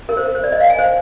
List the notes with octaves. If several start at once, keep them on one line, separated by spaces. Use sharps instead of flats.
A#4
C5
A#4
C5
D5
D#5
F5
G#5
C5